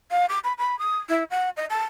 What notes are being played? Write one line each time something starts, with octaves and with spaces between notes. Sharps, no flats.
F5
D6
B5
B5
D#6
E4
F#5
D#5
A5